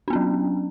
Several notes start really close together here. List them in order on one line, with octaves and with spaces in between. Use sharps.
D4 B3 C#4 F#3